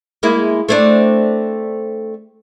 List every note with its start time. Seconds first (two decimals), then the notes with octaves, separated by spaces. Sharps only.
0.23 G#3 A#3 E4
0.69 A3 C4 D4